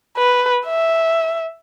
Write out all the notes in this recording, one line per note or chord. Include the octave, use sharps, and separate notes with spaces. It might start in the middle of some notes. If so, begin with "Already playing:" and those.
B4
E5